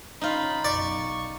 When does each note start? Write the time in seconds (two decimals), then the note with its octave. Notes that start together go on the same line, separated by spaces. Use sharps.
0.21 D3 C#4 D#4 F4 B5
0.65 F#1 B1 F#2 D5 C#6